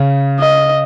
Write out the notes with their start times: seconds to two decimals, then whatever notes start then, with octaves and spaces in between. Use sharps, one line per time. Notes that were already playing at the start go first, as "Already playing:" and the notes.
Already playing: C#3
0.40 D#5